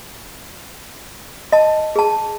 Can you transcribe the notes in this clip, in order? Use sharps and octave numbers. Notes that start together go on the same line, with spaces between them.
D#5 A5
G#4 A5